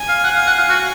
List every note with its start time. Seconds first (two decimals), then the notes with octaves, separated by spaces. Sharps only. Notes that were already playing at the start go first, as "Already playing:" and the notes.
Already playing: G#5
0.09 F5
0.24 F#5
0.35 F5
0.46 F#5
0.58 F5
0.69 F#4